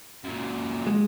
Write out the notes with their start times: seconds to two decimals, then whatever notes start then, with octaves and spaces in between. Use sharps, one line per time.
0.24 F#2 A#2
0.87 G#3